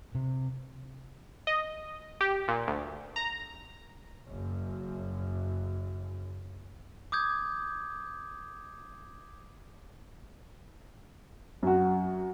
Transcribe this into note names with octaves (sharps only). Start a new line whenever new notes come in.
C3
D#5
G4
A#2
D2
A#5
F#1 F#2
D6 D#6 G6 G#6
F#2 F#4